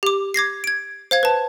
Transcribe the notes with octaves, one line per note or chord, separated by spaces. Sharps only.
G4 D6
D6 G#6 A#6 C7
G#6 D7
C5 F5 G#6
B4 A5